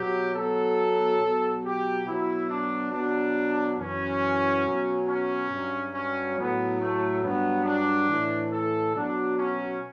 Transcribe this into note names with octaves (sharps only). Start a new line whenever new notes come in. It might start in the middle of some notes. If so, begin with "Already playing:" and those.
Already playing: B2 F#3 G4
B2 F#3 A4
B2 F#3
G4
B2 F#3 E4
D4
B2 F#3 D4
F#2 E3 C#4
B2 F#3
C#4
G2 F#3
C#4
A2 F#3 B3
A3
G2 F#3 B3
D4
A2 E3
A4
B2 F#3 D4
C#4